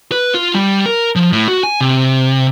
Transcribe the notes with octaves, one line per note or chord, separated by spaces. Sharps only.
B4
F4
G3
A#4
F3
A2
F#4
G#5
C3